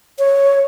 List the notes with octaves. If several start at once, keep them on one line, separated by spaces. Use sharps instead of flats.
C#5